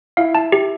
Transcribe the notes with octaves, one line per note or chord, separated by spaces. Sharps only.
E4 F5
A5
G4